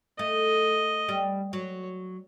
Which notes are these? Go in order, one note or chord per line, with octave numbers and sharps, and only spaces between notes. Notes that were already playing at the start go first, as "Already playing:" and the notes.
A3 D#5
G3
F#3 C#5